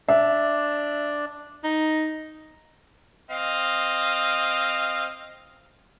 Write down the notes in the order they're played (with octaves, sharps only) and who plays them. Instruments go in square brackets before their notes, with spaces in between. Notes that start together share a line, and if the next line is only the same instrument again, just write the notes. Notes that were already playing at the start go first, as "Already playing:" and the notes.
[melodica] D4 D5 [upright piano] E5
[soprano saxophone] D#4
[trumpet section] C4 D#5 F5